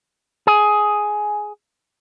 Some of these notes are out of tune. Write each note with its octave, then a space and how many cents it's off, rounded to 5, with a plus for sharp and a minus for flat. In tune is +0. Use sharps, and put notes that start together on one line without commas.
G#4 +10